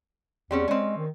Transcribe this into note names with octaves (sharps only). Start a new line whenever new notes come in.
E2 G3 C4 C#4
G#3 C4 C#4
D#3